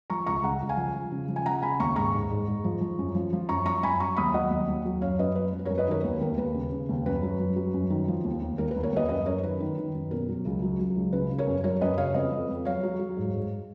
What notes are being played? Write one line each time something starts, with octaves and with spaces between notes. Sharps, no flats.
F3 A#5 C#6
C#2 A#5 C#6
C#2 F#5 A#5
C#2
F5 G#5
F3
F3
C#3
F3
G#5
C#3 F#5 A#5
C#3 G#5 B5
D#2 A#5 C#6
G#2 A#5 C#6
G#2
G#2
G#2
F3
F3
F#2
F3
F3
F#2 A#5 C#6
F3 A#5 C#6
F#2 G#5 B5
F#3 A#5 C#6
D#2 B5 D#6
F#3 D#5 F#5
D#2
D#2
F#3
F#2 C#5 F5
F#2 B4 D#5
F#3 B4
F#2
B4
A#4 C#5
F#2
B4 D#5
D#3 A#4 C#5
D#2 B4
D#2 A#4
D#2 B4
C#3
C#3
D#2
F#2 B4
F#3
F#2
F#3
F#2
D#3
F3
D#2
D#2
D#2 A#4
B4
D#2
A#4 C#5
D#2 B4 D#5
F#2 B4 D#5
F#2 A#4 C#5
D#3 B4
D#3
D#3
F#2
B2 A#4
F#3
C#2
F#3
F#3
C#2
C#3 B4
C#3
A#4 C#5
F#2
F#3 A#4 C#5
F#2 B4 D#5
C#3 C#5 F5
F2 B4 D#5
F2
F2
F#3 C#5 F5
F#3
F#3
G#2
G#2